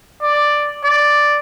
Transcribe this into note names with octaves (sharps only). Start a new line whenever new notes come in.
D5
D5